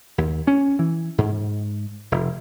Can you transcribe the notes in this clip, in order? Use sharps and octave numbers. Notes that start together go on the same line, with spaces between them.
D#2
C#4
E3
G#2
F1